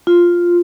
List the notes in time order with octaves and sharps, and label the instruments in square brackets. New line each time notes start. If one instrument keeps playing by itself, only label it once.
[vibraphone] F4